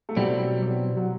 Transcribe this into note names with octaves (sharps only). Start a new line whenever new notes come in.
A3
B1 B2 F#3 G3 C4 E4
G3
F#3